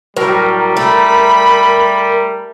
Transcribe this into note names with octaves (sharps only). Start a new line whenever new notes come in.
A2 F#3 G3 A#4
A3 B5